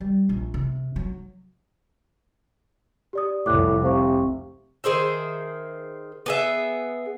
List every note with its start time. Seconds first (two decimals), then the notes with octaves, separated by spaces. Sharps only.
0.01 G3
0.29 A#1
0.54 C3
0.96 F#3
3.13 G4 D5 D#6
3.46 F1 C2 A2 D6 F#6
3.82 C3 C5 F5 C#6
4.84 D#3 G#4 C5 E5
6.26 B3 G#4 E5